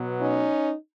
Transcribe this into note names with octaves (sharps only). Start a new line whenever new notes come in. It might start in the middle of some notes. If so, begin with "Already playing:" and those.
Already playing: B2 F#3 B3
C#4 D#4